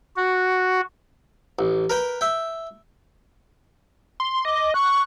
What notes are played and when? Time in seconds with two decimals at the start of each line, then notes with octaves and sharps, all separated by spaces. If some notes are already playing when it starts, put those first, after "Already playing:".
0.16 F#4
1.59 A1
1.90 A#4 B4 G5
2.21 E5 G5
4.20 C6
4.45 D#5 D6
4.74 C#6 F#6